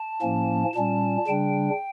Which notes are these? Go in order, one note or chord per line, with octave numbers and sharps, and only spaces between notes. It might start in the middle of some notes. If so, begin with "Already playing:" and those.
Already playing: A5
A2 F3 A#3 C#4
A#2 G3 C#4 A5
C#3 G3 D4 G5